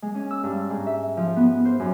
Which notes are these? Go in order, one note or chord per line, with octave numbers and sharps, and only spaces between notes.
G#3
C#4
E6
G2
G#2
E5
F3
B3
C5
F#2